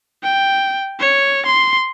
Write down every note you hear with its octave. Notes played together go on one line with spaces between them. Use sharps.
G5
C#5
C6